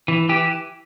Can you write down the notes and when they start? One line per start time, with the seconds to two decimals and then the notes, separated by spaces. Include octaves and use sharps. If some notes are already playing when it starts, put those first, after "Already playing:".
0.08 E3
0.29 E3 G4